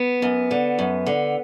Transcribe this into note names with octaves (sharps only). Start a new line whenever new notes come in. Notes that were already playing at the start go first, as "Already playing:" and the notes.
Already playing: B3
F#2
D3
F#2
D3